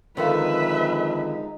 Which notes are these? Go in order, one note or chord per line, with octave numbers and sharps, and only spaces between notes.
F2 D3 D#3 F3 G#3 D#4 B4 E5